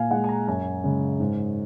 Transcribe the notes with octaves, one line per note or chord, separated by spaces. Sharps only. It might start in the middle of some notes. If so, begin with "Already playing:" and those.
Already playing: A#2 F5 G#5
G#3 F#5
G#5
A#5
F#2 G#5
C#3 G#3
G#2